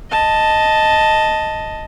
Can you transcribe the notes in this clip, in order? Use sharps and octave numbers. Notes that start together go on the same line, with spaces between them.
D#5 A5